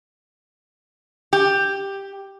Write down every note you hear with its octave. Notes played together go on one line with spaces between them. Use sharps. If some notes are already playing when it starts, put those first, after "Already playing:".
G4